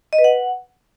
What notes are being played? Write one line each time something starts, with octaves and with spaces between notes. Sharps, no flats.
D#5
B4
F#5